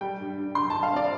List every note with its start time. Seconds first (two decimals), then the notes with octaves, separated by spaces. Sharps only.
0.01 G3 G5
0.20 G2
0.38 G2
0.55 G2 C6
0.70 A5
0.73 G2
0.83 F5
0.93 C4 D5